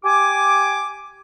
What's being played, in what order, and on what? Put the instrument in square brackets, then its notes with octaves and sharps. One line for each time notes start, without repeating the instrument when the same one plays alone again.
[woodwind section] G4 G#5 D6